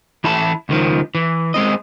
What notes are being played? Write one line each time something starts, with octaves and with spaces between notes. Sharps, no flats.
E3 E4 E5 A5 B5
C#2 D#3 F3
E3
G#3 C4 D#5